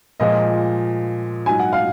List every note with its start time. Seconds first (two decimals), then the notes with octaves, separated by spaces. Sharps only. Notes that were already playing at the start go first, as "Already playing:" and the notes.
0.20 A#2 F3 G#3 D#5
1.46 G#2 F#3 G#5
1.59 F#5
1.73 F5